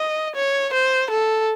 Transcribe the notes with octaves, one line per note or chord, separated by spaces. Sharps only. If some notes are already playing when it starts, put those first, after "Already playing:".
Already playing: D#5
C#5
C5
A4